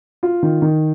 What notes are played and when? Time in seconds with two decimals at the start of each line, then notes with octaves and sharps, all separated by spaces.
0.23 F4
0.43 D#3
0.62 D#3